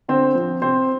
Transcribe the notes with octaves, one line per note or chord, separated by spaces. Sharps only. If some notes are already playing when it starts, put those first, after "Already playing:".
D3 C4 C5
F3 C4
C3 C4 C5